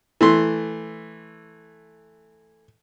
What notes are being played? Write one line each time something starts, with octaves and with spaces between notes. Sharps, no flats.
E3 A3 C6